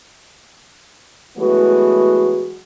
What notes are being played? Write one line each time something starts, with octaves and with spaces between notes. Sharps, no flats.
E3 F#3 G#3 A3 B3 F#4